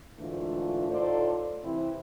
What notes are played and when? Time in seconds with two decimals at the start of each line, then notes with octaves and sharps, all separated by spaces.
0.18 D2 G#2 E3 A3 D4 F4
0.89 A2 D#4 F4 A4 C5 D5
1.64 C3 E3 C4 E4